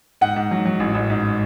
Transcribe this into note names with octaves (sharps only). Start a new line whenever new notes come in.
G#2 F#5
G#2
F#3
F#3
A1
A1
G#2